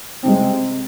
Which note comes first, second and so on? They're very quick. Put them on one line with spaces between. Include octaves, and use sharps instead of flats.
C4 C3 G#3